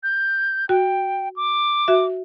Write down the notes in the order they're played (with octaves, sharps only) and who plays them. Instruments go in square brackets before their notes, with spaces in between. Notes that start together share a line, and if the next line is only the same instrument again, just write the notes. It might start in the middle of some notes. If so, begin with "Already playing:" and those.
[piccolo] G6
[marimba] F#4 [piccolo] G5
[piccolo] D6
[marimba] F#4 E5